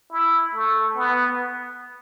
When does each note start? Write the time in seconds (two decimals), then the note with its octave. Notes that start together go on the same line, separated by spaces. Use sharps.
0.11 E4
0.54 A3
0.97 B3